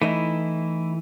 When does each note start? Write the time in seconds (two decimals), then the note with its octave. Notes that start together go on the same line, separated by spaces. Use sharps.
0.02 E3 A3 D#4 E4